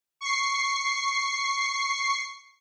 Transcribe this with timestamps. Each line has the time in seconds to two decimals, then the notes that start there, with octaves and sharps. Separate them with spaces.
0.21 C#6 C7